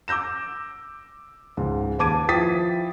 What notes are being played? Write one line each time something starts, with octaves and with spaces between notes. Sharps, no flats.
D6 E6 G6 A#6 E7
C#2 G#2
D#2 B4 A5 D6 G#6 D#7
F3 E4 G5 D#6 A6 B6